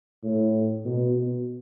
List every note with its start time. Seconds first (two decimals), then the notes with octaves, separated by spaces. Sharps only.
0.23 A2
0.85 B2
1.16 B2